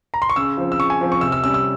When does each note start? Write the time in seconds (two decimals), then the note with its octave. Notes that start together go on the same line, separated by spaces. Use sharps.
0.14 A#5
0.22 C6
0.30 C#6
0.36 C#3 E6
0.58 F3 C4
0.72 E6
0.79 C#3 C#6
0.90 G#5
1.01 F3 C4
1.12 C#6
1.21 C3 E6
1.32 E6
1.43 G3 C#4 E6
1.54 E6